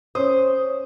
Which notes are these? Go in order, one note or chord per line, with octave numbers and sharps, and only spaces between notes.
C#4 C5 D#6